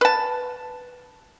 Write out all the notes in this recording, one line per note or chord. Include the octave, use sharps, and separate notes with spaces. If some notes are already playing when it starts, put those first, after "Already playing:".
B4 A5